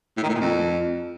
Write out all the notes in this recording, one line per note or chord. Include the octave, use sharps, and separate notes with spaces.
A2
D#3
A2
A#2
F2